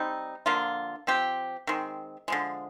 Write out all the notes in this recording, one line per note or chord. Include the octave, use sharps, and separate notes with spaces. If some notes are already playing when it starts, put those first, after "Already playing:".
Already playing: G3 C4 D#4
D3 F3 A#3 F4
F3 C4 G4
D#3 G#3 C4
D3 F3 G#3